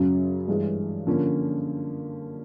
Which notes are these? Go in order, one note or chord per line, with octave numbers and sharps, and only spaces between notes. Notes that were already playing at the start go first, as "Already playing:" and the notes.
Already playing: F#2 C#3 F#3
G2 E3 G#3
D3 F3 A#3 C#4